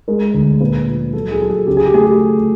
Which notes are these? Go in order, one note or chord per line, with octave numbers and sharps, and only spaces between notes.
G#3 A#4
D2
A#2 B4
F3
F#3 A4
G#4
F#3 A4
G#4
C#3 G4
G#4
G4
A3 G#4
G4